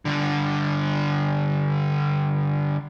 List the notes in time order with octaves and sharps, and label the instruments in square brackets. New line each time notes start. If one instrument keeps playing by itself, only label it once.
[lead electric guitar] G2 D3